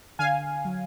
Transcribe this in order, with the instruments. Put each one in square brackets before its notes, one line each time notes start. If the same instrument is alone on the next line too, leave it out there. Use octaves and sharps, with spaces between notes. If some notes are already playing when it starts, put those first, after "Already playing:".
[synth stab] D3 F5 G#5
F#3